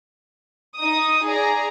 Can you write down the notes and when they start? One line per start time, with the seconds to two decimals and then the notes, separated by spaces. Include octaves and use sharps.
0.77 D#4 D#6
1.26 G#4 D5 A#5